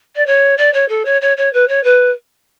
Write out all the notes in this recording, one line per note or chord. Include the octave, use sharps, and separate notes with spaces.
D5
C#5
D5
C#5
A4
C#5
C#5
C#5
B4
C#5
B4